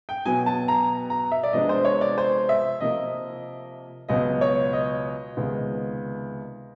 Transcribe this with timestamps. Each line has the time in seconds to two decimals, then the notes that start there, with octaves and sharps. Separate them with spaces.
0.09 G5
0.26 B2 F#3 B3 G#5
0.46 A5
0.68 A#5
1.10 A#5
1.32 E5
1.43 D5
1.53 C3 F3 G#3 B3 D4 D#5
1.69 C5
1.85 C#5
2.01 D5
2.18 C5
2.49 E5
2.81 C3 F3 A#3 D#5
4.09 C#2 B2 F#3 B3 D#5
4.41 C#5
4.73 D#5
5.37 C#2 C3 D#3 G#3 B3